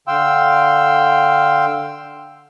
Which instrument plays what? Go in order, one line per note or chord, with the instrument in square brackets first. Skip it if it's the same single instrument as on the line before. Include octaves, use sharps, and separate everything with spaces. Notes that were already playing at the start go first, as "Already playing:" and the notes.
[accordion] D3 F5 G5 C6 E6